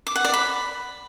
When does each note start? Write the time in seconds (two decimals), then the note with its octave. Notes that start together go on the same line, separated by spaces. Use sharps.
0.07 D6
0.16 F#5
0.25 D5
0.34 B5